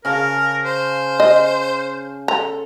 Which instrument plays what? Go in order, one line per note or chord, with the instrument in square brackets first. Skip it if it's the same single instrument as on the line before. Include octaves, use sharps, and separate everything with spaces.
[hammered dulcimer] C#3 F5 A5 [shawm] A#4
[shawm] C5
[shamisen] D#5
[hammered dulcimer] A4 [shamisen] A#5